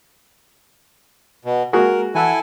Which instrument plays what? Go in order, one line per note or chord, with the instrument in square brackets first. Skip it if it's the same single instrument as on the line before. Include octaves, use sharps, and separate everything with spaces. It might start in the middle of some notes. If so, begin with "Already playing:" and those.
[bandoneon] B2
[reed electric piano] G#3 A#3 G#4 [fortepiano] F#4 [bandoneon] A#4
[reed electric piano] E3 F#5 E6 [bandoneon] E4 A4 G#5